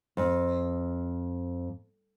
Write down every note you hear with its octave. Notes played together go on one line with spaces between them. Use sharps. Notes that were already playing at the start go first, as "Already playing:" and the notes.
F2